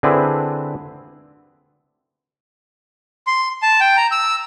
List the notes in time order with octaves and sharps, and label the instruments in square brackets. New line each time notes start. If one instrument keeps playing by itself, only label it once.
[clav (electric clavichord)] D3 C4 D4 E4 G#4 B4
[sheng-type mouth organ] C6
A5
G5
A#5
E6